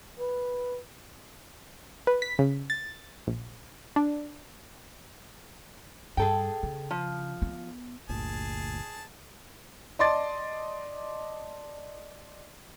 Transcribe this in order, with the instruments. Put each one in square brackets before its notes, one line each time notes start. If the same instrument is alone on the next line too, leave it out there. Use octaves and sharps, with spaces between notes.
[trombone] B4
[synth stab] B4
B6
C#3
A6
A#1
D4
[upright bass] G2 [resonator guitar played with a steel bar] G#4 A4 G5
[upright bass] C#3
[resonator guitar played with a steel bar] F3
[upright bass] B3
[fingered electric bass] G1 D2 A#2 [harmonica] G#4 A5
[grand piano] D5 D#5 A5 C6 D6 A6